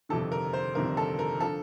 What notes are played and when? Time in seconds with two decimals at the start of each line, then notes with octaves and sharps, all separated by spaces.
0.09 G1 F2 C3 D#3 A4
0.32 A#4
0.53 C5
0.75 G1 F2 C3 D#3 A#4
0.97 A4
1.19 A#4
1.40 D3 F3 A4